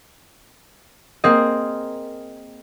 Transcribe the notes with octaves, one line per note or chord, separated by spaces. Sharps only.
A#3 C4 G#4 D#5